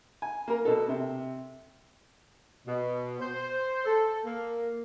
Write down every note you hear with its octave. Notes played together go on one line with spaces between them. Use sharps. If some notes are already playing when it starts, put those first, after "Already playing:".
G#5
A#3 A#4
B2 A4
C3
B2
C5
A4
A#3